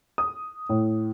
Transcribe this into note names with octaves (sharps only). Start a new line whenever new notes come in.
D#6
A2